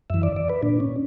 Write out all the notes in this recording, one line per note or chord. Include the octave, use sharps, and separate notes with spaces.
F#2 E3 E5
D5
D5
B4
A#2 D4
C#4